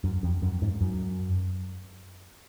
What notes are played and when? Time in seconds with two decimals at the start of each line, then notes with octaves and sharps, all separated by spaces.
0.04 F#2
0.23 F2
0.42 F#2
0.62 G#2
0.81 F#2